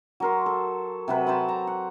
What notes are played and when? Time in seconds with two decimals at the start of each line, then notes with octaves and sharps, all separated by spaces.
0.20 F#3 A#4 C6
0.46 A4
1.08 C3 F#3 B4
1.27 C5 A5 B5
1.49 A#5
1.67 F#5